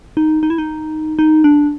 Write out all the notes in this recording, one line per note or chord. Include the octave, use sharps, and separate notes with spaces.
D#4
D#4
E4
D#4
D#4
D4